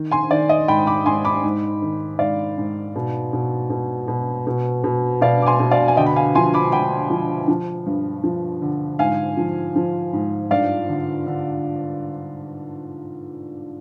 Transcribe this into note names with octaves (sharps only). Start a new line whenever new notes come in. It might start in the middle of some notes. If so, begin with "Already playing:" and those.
Already playing: D#3
G#5 C6
D#3 D5
D#5
G#2 G5 B5
B5 D6
G#2 G#5 C6
B5 D6
G#2
D#3
G#2 D5 F5
G#2
B2
B2
B2
B2
B2
B2
B2 D5 F5
D6
G#5 C6
B2
D5 F5
G#5
D3 D#5 G5
B5
F5 G#5
F3 G#5 C6
B5 D6
D3 G5 B5
F3
F3
G2
F3
D3
G#2 F5 G#5
F3
F3
G#2
G2 D5 F5
D3
D3